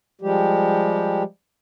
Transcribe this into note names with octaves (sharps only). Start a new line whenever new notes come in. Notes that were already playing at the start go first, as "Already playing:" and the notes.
F3 G3 G#3 G4